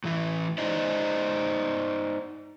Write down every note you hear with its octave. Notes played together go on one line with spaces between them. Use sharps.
A2 E3 E4
D#4 C5 D5 D#5